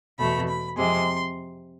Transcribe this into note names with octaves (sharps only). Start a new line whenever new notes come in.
E2 B2 A3 B5
B5
F2 C3 G#3 C6